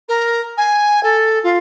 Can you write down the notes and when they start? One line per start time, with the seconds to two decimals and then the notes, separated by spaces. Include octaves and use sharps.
0.08 A#4
0.57 G#5
1.03 A4
1.43 F4